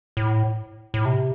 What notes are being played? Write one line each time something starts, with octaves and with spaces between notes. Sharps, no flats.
A2
A2
C3